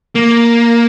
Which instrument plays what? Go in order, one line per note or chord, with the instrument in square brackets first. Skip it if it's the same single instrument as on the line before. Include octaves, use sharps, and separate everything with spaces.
[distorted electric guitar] A#3